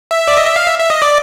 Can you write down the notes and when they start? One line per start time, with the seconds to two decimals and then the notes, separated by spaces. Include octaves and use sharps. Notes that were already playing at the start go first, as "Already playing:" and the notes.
0.11 E5
0.27 D5
0.37 D#5
0.47 E5
0.56 F5
0.67 E5
0.78 E5
0.90 D#5
1.02 D5